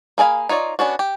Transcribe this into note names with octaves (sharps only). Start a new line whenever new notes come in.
A#3 G#4 D5 F5 B5
D#4 F4 C#5 D5
B3 C#4 D4 F#4
G4